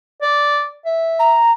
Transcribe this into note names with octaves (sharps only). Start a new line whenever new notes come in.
D5
E5
A#5